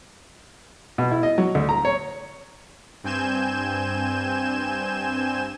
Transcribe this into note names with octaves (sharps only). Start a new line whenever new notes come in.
B2
E4
D#5
F#3
D2
A#5
C#5
G2 C4 G#5 G6 E7